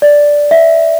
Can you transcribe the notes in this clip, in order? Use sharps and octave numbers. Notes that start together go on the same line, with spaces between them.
D5
E5